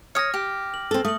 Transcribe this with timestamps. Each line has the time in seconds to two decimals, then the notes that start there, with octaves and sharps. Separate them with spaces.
0.15 C#5 D#6 F6 A#6
0.34 G4
0.74 F#7
0.91 C4 A4
1.05 A3 D#6 F#7